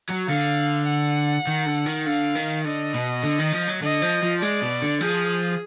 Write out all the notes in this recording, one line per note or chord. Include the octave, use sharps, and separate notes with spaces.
F#3
D3 F5
F#5
D#3
D3
D#3
D3 F5
D#3
D3 D#5
B2
D3
D#3
F3
F#3
D3 D#5
F3
F3
G#3 D5
B2
D3
F3 G#4